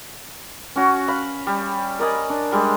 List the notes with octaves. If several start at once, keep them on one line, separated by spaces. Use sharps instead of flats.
C#4 F#4
F5 B5
G3
A#4 D5 D#5 G#5
D4
G3 G#3